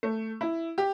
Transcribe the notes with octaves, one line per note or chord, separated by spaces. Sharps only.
A3
E4
G4